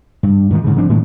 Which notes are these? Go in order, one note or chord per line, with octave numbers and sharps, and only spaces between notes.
G2
G#2 D#3 F3
G#2 C#3
F3 C4 D4
A2 D#3 G#3 A3